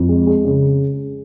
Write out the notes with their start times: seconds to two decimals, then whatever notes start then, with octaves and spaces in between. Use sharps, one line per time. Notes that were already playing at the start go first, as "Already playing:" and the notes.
Already playing: F2
0.09 G#3
0.27 G#3
0.45 C#3